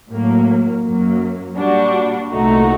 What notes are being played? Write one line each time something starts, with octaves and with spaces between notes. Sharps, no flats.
A2 F#3 A#3
F#2 F#3 A#3
A#2 G3 D4 F#4
C2 A#2 A3 D#4 F#4